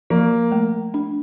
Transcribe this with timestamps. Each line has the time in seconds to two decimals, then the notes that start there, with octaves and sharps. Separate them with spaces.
0.10 F3 A#3
0.52 A3
0.94 D4